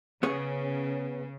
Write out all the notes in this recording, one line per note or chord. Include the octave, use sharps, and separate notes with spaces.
C#3 B3 G#4 C#5